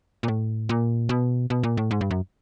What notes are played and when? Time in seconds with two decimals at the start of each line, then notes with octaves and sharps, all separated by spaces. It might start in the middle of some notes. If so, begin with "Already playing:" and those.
0.23 A#2
0.28 A2
0.69 A#2
1.09 B2
1.50 B2
1.63 A#2
1.77 A2
1.91 G#2
2.01 G2
2.11 F#2